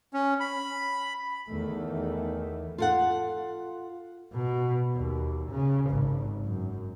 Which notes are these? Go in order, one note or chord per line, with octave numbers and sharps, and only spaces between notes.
C#4
B5
E2 D#3 E3 A3
F4 A4 F#5
B2
D#2
C#3
G#1
F#2